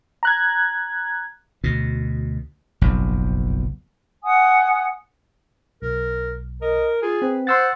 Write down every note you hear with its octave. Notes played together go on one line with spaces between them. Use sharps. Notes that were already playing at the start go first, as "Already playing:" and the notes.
A#5 F#6 G#6
D2 B2
F#1 B1 F2
F#5 G#5 D#6
B1 A#4
A#4 D#5
F4 G#4
C4 B4
C5 F#5 C6 E6 A6